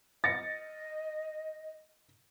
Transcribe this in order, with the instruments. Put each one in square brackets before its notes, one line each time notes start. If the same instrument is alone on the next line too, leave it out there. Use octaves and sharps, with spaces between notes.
[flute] D#5 [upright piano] A6 A#6 C#7